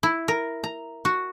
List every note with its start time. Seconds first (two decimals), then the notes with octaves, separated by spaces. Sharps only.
0.03 E4
0.28 A#4
0.64 A#5
1.05 F#4